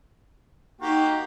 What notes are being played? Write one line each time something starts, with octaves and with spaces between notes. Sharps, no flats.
A#3 D#4 F#4 G4